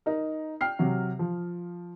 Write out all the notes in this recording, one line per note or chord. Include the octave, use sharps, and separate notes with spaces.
D#4 A#4
G5 F6 C7
C3 F#3
F3